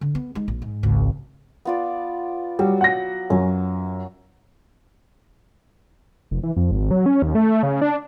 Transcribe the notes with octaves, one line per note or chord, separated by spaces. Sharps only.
D3
B3
G#3 D#4
A#1
G#2
G#1 C#2
B3 F4 D5
F#3 G3
F#5 A#6
F#2 C#4
F1
E3
F2
G#1
F#3
C#4
D#2
A3
C#3
D4